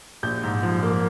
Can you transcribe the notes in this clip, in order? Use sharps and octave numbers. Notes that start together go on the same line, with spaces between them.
A#1 G6
G#2
F3
A#3